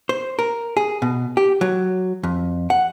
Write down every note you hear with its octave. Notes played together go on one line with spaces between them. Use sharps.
C5
A#4
G#4
B2
G4
F#3
F2
F#5